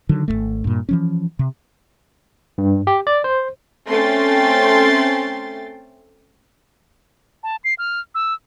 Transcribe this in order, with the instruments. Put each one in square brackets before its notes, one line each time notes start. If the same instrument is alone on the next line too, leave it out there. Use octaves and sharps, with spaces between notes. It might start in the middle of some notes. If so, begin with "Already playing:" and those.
[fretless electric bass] D3 D#3 F#3
G#1 D#2 A3
G2 A#2
E3 F3 C#4
C3
[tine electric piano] G2
G4
D5
C5
[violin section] A3 C4 C#4 G5 C6 A6
[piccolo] A5
C7
F6
E6